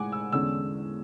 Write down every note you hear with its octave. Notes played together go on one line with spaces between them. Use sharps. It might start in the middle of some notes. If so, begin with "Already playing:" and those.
Already playing: A2 G#3 F#5 G#5 D6
E6
E2 D3 G#3 C#4 E6